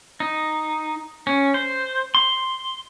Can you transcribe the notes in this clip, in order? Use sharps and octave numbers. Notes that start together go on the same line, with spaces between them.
D#4
C#4
C5
C6